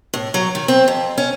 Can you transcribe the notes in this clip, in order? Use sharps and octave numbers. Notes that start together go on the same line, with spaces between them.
A2
F#3
D#3
C4
F2
C#4